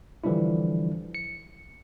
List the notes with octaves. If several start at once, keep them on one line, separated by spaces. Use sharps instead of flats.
D3 E3 F3 G3 D4 E4
C#7